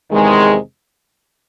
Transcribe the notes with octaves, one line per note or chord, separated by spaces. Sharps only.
E2 C3 D#3 G#3